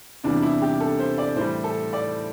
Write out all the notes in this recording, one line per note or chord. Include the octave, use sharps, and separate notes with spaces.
E2 C3 E3 G3 D4
E4
G4
A4
C5
D5
A2 E3 G3 C5
A4
D5